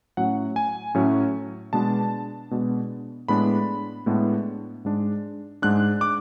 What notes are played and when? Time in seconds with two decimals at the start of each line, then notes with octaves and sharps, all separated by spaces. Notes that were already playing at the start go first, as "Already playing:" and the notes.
0.17 A2 F#3 A3 C#4 F#5
0.56 G#5
0.95 A2 F#3 A3 C#4
1.73 B2 G#3 B3 D4 A5
2.51 B2 G#3 B3 D4
3.28 A2 G#3 B3 D4 B5
4.06 A2 G#3 B3 D4
4.85 G#2 G#3 D4
5.62 G#2 G#3 D4 F#6
6.01 D6